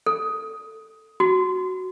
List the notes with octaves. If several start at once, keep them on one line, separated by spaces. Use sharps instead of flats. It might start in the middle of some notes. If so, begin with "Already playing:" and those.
A4
F#4